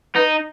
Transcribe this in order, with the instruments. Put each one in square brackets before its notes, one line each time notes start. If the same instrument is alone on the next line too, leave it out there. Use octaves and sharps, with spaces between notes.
[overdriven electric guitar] D#4 [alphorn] B4